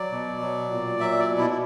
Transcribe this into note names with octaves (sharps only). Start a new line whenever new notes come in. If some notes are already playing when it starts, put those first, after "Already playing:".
Already playing: F#3 D5
B2
F#3
A#2
F#3 E5
D5
B2
E4
E4